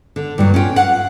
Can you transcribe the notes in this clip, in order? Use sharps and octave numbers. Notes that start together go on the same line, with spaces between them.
D3
G2 A#2 F#3
C#4 F4 G5
F5 F#5